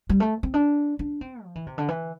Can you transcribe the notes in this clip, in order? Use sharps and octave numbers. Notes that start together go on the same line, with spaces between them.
G3
A3
C4
D4
D4
C4
F3
E3
C3
D3
E3